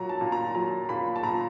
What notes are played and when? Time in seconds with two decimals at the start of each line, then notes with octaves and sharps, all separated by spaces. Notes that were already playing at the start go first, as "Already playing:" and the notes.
Already playing: A#2 F#3 A#5
0.09 A5
0.21 A#2
0.32 A#5
0.55 F#3 A#5
0.89 A#2 B5
1.16 A5
1.23 A#2 A#5